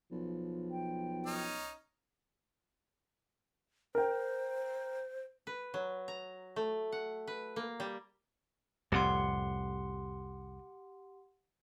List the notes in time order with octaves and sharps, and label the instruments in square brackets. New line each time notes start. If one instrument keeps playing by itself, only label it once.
[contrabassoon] B1 [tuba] F3
[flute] G5
[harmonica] C#4 D#4
[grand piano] A#4 G5 [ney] C5
[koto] B4
F#3
A#5
A3
F#5
B4
A#3
G3
[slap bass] C2 F2 A2 [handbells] G4 F#5 C6